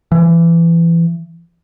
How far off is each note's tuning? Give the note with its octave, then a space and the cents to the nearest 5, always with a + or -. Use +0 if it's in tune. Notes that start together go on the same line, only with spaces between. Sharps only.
E3 +25